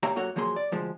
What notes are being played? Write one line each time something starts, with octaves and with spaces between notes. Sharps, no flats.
A#3 G4 C#5 E5 F5 A#5
F#2 A#3 F#4 A4 C#5 F#5
F3 F#3 A#3 G#4 C6
D5
D2 F3 G#3